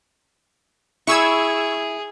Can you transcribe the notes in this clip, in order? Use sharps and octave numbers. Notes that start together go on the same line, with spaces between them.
E4 G#4 C#6 E6 G#6